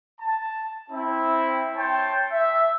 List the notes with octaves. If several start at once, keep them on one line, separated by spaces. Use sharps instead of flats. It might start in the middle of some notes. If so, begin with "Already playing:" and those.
A5
C4 E4
C#5 G5 A5 C6
E5